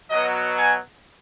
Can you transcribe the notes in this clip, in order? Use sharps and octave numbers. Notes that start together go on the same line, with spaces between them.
B2 F#3 D#5
G#5